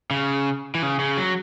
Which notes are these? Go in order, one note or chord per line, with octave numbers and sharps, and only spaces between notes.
C#3
E3
C#3
C#3
F#3